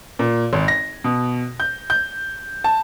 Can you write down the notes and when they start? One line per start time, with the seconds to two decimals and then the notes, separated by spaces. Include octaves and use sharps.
0.19 A#2
0.53 G#1
0.68 A#6
1.04 B2
1.60 G6
1.90 G6
2.64 A5